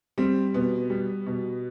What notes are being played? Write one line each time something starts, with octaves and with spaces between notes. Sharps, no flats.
G3 C4
B2 B3
G3
B2